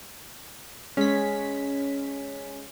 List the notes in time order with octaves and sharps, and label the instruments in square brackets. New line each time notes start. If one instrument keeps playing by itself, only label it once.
[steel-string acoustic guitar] G#3 [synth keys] C#4 B6